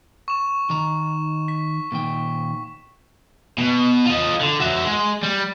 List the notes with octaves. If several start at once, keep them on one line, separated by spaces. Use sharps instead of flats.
C#6 E7
D#3 A#5
B6
A#2 D#3 G5
B2
F4 D#5
D3
F#4 E5
G#3
G3